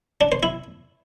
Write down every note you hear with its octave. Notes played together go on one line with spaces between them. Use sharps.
D4
C5
E4